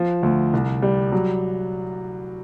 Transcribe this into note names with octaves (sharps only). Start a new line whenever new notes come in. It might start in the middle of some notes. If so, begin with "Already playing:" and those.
Already playing: F3
D2
C2
G3
F#3